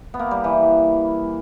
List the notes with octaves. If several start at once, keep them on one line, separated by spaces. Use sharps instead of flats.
B3
A#3
G3
E3